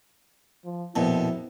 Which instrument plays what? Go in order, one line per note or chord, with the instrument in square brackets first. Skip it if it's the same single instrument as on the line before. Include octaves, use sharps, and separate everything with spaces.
[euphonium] F3
[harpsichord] A#1 F2 B2 [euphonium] E4